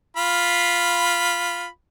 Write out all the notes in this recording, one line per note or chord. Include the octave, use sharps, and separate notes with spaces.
F4 B5